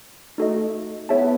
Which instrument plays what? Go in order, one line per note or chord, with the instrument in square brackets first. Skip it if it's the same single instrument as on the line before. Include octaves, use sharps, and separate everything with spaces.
[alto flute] A3 [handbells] D#4 F#4 A4 D#5
[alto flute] B3 [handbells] E4 G#4 C#5 E5 A5